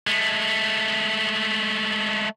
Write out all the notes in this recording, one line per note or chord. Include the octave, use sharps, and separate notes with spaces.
G#3 A3